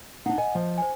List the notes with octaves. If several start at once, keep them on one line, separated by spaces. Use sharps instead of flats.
D4 D#4 F#5
D#5 F#5 G#5
F3
C5 G#5